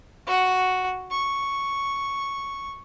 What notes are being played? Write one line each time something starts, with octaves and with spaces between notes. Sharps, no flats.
F#4 F#5
C#6